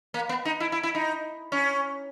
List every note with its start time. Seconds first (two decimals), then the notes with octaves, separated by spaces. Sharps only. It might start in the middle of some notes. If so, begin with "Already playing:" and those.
0.14 A#3
0.29 B3
0.45 D#4
0.60 E4
0.72 E4
0.83 E4
0.95 D#4
1.52 C#4